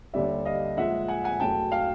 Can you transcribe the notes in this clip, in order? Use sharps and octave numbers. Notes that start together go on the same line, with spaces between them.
D#2 D3 G3 D5 E5
D#5 F5
A#2 F3 G#3 E5 F#5
F#5 G#5
F#5 G#5
E2 B2 F#3 A3 G5 A5
F5 G5